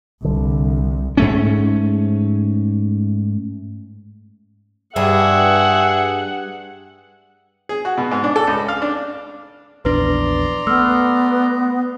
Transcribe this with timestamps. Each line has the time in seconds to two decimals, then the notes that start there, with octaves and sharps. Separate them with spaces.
0.24 C2 D3
1.17 G#2 A3 C#4
4.96 G2 G#4 E5 F#5
7.69 G#4
7.85 F#4
7.97 B2
8.11 G#2
8.24 D4
8.36 A4
8.47 C#2
8.68 F5
8.82 D4
9.85 A#1 E2 D4 B4 D5 A#5 C6
10.67 A3 B3 E6 F6